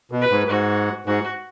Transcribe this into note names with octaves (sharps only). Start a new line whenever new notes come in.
B2
B4
G#2
G#2 F#4
G#2 F#4